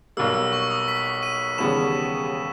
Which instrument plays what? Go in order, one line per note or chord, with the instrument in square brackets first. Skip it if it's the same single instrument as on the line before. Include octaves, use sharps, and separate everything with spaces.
[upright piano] B1 B2 G3 A#3 [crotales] E6
[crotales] E6
C#6
D#6
B6
D#7
[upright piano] E1 D#2 C#3 G3 B3 [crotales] E7